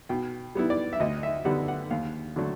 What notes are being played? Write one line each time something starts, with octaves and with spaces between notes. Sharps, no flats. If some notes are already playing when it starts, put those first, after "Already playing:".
B2 G5
G3 B3 E4
D5
E5
D2 D#5
E5
D3 G3 B3 F#5
F#5
D#2 F5
D3 F#3 A3 D4